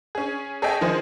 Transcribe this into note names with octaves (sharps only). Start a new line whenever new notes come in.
C#4 G#4
G#4 A4 C#5 D#5 E5 G5
D#3 F3 D#4 G#4 C5